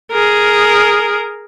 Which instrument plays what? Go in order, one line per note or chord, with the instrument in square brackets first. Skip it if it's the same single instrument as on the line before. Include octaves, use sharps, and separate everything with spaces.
[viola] G#4 A#4